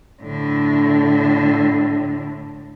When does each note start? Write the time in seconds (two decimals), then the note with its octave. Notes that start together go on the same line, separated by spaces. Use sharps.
0.22 A2 D3